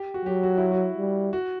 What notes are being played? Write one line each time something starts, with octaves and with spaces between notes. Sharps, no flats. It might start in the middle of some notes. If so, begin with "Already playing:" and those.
Already playing: G4
F#4
F#3 G4
F#4
E4
F#4
G3
F#4